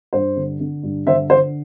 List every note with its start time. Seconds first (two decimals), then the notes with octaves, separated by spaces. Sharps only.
0.13 G2 C5
0.37 D3
0.60 D3
0.83 G2
1.06 D3 C5 E5
1.30 D3 C5